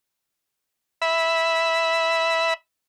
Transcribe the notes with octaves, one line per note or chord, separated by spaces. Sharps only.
E5 B5